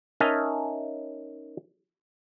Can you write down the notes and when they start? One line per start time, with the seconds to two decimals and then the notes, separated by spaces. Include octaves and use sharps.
0.20 C#4 D#4 A#4 E5 G#5 A5